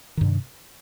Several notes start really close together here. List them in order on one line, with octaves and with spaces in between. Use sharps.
D#3 G2 C3